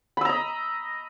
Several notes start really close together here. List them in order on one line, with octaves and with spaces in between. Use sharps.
B5 E6 A#5 D#5